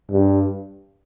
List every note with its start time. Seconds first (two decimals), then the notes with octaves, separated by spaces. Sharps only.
0.11 G2